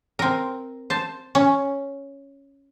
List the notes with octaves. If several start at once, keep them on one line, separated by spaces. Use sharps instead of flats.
C4 A#4
C5 A5
C#4